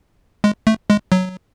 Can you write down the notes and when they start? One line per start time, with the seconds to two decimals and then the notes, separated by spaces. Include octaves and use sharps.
0.44 G#3
0.67 A3
0.90 G#3
1.12 F#3